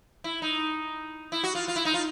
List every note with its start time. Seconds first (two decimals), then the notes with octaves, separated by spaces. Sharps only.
0.24 E4
0.42 D#4
1.32 E4
1.44 F#4
1.55 F4
1.68 F4
1.76 E4
1.85 D#4
1.94 F4